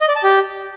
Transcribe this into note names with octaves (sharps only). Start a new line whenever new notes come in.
D#5
D5
A5
G4